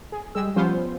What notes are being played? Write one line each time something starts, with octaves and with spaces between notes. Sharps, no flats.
G#4
G3 G#3 E6
F3 G3 B3 C#4 F4 C5